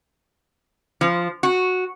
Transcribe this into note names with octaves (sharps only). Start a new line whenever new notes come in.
F3
F#4